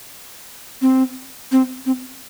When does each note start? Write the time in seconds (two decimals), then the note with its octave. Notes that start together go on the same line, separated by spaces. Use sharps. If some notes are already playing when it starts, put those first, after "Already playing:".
0.82 C4
1.52 C4
1.86 C4